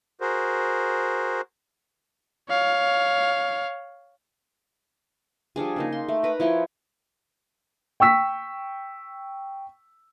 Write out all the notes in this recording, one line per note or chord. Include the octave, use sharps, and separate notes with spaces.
F#4 G#4 A#4 C5
C#5 F5
F3 G3 D4 G#4
C#3 A#3 D#4
C6
A3
A#4 B4 A#5 B5
F3 E4 C#5 G5
G5 C#6 E6 B6